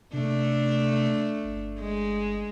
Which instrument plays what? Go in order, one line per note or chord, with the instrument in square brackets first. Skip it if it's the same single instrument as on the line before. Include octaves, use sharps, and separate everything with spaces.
[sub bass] C3 [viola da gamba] A3 D4
[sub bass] G1
[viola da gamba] G#3